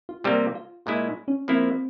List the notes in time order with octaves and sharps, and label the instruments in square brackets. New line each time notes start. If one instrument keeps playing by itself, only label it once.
[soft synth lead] F4
[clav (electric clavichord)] C3 G3 A#3 [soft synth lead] G4
[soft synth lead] F4
[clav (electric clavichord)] A#2 G#3 E4 [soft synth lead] F4
[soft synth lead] C#4
[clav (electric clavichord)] F3 A#3 E4 [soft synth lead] C4